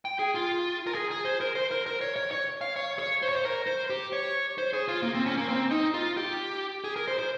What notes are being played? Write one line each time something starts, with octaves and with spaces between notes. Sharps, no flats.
G5
G#4
F4
A#4
G#4
G#4
C5
A#4
C5
A#4
A#4
C#5
C#5
C#5
F5
C#5
C#5
C5
C#5
C5
A#4
C5
G4
C#5
C5
G#4
F4
A#3
C4
C#4
A#3
C4
D#4
F4
G4
G#4
A#4
C5
C5